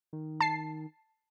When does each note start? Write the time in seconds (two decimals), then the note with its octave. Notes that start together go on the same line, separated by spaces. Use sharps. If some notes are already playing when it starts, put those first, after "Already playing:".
0.13 D#3
0.41 A5 C7